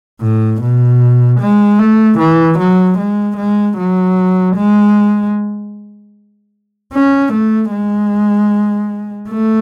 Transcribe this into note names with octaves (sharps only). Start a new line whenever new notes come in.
A2
B2
G#3
A3
E3
F#3
G#3
G#3
F#3
G#3
C#4
A3
G#3
A3